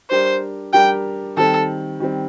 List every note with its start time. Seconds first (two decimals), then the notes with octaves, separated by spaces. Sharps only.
0.10 G3 D4 G4 A#4 C5
0.73 G3 D4 G4 A#4 G5
1.37 D#3 G3 C4 A4
2.00 D#3 G3 C4